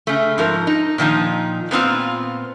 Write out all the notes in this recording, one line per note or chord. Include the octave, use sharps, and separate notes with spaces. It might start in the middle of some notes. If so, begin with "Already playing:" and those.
C#3 A3
G#2 F3 A#4
D#4
A#2 D#3 F3 D#4
A#2 B3 C4 F4